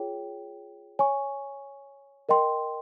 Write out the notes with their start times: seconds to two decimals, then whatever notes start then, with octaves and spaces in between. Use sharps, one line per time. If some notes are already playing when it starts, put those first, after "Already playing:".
Already playing: F4 G#4 C#5 G5
0.99 C#5 G#5 C#6
2.29 A#4 D#5 G5 C6